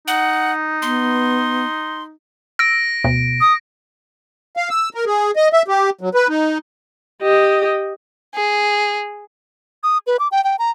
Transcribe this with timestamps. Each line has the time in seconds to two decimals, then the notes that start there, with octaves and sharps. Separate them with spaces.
0.08 D#4 F#5
0.82 B3 C6
2.59 E6 A#6 D7
3.04 D2 B2
3.41 D#6
4.57 F5
4.69 E6
4.94 A#4
5.06 G#4
5.36 D#5
5.53 E5
5.68 G4
6.01 F#3
6.15 B4
6.28 D#4
7.22 G4 D#5
8.35 G#4
9.83 D#6
10.07 B4
10.19 D6
10.32 G5
10.44 G5
10.59 A#5